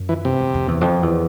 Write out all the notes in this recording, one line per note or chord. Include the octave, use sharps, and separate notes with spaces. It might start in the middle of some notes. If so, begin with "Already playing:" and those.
Already playing: F#2
E3
C3
F#2
F2
E2
F2
E2